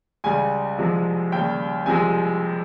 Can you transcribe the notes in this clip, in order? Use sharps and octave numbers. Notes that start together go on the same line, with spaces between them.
C#2 C#3 G3 G#5
C2 C3 F3 G#3
D#2 C#3 G3 G5
C2 C3 F3 G#3 G#5